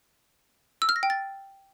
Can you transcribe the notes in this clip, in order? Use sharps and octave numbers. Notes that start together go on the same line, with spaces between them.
E6
F6
A#6
G5
A6